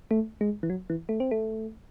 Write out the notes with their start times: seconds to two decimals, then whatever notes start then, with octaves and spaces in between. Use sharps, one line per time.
0.11 A3
0.41 G#3
0.63 E3
0.70 F#3
0.90 E3
1.09 A3
1.20 C4
1.31 A3